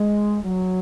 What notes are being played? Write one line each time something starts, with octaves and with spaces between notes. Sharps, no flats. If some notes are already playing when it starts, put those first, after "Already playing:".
Already playing: G#3
F#3